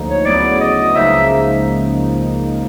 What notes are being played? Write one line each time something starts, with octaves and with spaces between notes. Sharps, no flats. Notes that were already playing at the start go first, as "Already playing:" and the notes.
Already playing: D2 D3 F3 A#3 D#4
C#5
D2 C#3 F#3 B3 E4 D5
D#5
C#2 C#3 F3 A#3 D#4 E5